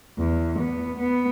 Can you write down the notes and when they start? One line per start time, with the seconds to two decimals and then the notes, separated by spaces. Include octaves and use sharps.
0.18 E2
0.58 B3
1.00 B3